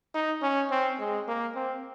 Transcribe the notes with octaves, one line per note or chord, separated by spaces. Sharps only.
D#4
C#4
C4
G#3
A#3
C4